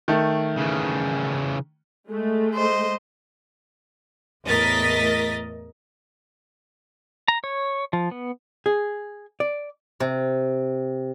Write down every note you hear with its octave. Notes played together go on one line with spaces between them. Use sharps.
D#3 A3
C#3 E3
G#3 A3
C5 D#5
E2 A2 A#4 D#5 A6 B6
A#5
C#5
F3
B3
G#4
D5
C3